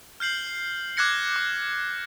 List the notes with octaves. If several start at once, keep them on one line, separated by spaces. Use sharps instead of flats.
F6 G6 C7 F#7
D6 F6 F#6 G#6 A#6 C#7
D6